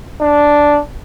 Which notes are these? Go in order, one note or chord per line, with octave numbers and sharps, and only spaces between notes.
D4